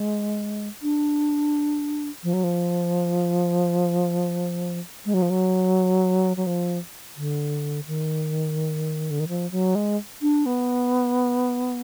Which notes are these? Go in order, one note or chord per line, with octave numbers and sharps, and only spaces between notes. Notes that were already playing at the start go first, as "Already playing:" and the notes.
Already playing: G#3
D4
F3
F#3
F3
G#3
F#3
F3
F#3
F#3
F3
D3
D#3
D3
D#3
F3
F#3
G#3
D4
B3